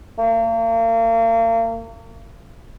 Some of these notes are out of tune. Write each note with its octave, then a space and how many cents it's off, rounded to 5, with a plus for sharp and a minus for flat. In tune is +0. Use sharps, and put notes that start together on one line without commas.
A#3 -40